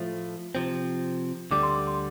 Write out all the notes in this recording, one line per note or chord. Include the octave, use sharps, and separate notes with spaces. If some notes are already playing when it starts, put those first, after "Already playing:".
Already playing: A2 F3 A3 F4
C3 F3 C4
D2 D3 G3 D6
C6
D6
C6